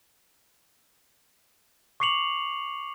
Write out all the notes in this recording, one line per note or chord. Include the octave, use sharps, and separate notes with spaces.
C#6 D6 C7 C#7 F7 F#7